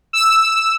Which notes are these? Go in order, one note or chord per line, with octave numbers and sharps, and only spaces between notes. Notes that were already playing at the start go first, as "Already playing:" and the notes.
E6